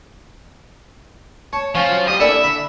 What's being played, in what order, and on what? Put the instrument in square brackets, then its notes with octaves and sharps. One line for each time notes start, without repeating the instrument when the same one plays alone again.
[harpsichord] C#5 [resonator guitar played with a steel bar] A5
[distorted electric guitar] F3 F4 [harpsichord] C#4
[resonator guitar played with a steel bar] F#3
[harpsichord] G3 G4 [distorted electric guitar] D#5
[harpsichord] A#3 D4 E4 [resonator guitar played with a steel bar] A4 D5 G#5 [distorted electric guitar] E5
[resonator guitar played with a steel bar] D3 [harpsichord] B5